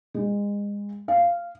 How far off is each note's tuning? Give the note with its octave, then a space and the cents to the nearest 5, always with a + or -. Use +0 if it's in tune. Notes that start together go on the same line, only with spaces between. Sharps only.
G#3 -30
F5 -10